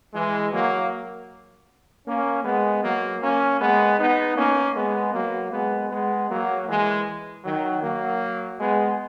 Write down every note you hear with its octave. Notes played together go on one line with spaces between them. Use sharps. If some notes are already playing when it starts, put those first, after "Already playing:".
E3 G#3
F#3 A#3
A#3 C#4
G#3 B3
F#3 A#3
A#3 C#4
G#3 B3
B3 D#4
A#3 C#4
G#3 B3
F#3 A#3
G#3 B3
G#3 B3
F#3 A#3
E3 G#3
D#3 F#3
F#3 A#3
G#3 B3